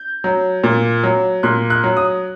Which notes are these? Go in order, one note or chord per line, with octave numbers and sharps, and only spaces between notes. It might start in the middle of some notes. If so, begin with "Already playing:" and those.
Already playing: G6
F#3
A#2
F#3
A#2 F#6
F#6
F#3
D#6